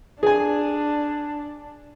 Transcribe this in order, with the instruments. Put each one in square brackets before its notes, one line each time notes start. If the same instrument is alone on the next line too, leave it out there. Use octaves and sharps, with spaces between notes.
[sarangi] D4 [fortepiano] G#4 G#5